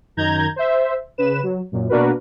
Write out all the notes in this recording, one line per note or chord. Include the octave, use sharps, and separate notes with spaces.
F#2 D#3 A#5 G6 G#6
C5 E5
C#3 B4 E7
F#3
F#2 A#2
B2 A#3 D4 F#4 A#4 B4